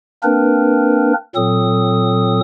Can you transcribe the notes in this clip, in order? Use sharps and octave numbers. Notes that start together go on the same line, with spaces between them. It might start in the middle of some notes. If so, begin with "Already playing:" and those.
A#3 C4 D4 A#4 B4
A#2 F#3 C4 A4 D#6